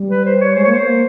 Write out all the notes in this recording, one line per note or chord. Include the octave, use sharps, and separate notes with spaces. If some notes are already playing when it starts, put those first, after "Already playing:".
Already playing: G3
B4
C5
C#5
G#3 C5
A#3 C#5
B3 C5
A#3